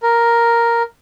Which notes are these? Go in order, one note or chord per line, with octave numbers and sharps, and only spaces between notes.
A#4